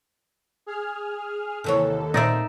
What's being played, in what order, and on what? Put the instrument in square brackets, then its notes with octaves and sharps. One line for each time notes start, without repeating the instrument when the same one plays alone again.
[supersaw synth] G#4 F6
[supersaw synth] D#2 A4 [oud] C3 E3 C#5
[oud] A#2 C4 [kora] D#4 D5 E5